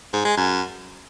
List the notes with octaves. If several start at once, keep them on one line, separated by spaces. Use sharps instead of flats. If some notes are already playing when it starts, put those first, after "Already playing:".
G#2
G#3
F#2